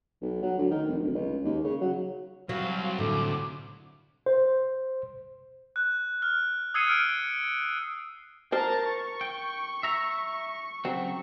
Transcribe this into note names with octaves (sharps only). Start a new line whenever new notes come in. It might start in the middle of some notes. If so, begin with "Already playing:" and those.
B1
F#3
D2
D#3
F1
D1
C#2
D#2
C#3
F#3
C2 F#3 F5
A2 D3 D6
C5
F#6
F6
D#6 E6 G#6 C7 C#7 D#7
F6 D7
A#4 C5 A5 A#5
C#6
G5
E5 A#5
C#3 F#3 C4